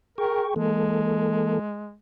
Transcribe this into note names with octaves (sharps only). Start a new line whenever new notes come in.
G#4 A#4 G5 C#6
E3 G#3 A#3 A4